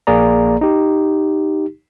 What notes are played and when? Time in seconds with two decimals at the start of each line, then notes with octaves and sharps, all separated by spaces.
0.07 A#1 A#3 G#4 D5 A#5
0.61 D#4 G4